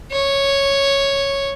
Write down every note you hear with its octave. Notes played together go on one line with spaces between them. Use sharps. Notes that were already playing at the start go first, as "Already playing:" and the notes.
C#5